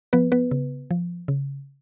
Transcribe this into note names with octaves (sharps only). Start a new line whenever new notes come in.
F3 B3 B4
B3 B4
C#3
F3
C#3